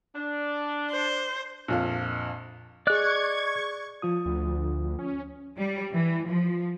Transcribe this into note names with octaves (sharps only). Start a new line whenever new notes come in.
D4
C5
A#1 F2 F5
G#4 D5 D#5 C#6 F#6 G#6
F3 F4 D#6
D2
C#4
G3
E3
F3